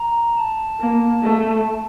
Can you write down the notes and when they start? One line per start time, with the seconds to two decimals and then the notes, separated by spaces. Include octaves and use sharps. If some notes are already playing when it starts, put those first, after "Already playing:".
Already playing: A#5
0.37 A5
0.80 A#3
1.23 A3